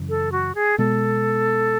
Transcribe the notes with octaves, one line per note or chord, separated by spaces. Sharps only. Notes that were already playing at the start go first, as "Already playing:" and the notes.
Already playing: F#2 C#3 E3
A4
F#4
G#4
B2 G#3 B3 A4